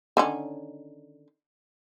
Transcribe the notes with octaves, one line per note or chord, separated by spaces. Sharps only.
D3 D#3 C#4